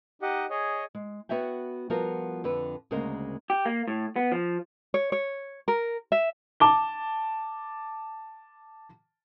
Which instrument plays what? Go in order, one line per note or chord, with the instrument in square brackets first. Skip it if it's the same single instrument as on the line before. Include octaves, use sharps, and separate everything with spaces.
[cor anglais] D#4 [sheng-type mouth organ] G4 D#5 F#5
[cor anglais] G#4 [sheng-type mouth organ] C#5 D#5
[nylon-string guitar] G#3
B3 F#4 C#5 E5 G5
F3 G3 B3 F4 F#4 A#4
F2 D3 B4
D2 C#3 G#3 A#3 A#4 C5
[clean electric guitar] G4
A#3
A2
B3
F3
[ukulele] C#5
C#5
A#4
E5
[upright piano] A5 D6 G7